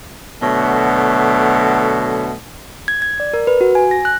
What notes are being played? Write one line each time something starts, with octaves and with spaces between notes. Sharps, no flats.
B2 D3 F#3 A3
G#6
G#6
D5
A#4
B4
F#4
G#5
A#6
F#6